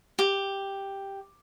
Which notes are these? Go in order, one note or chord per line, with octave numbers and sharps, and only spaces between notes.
G4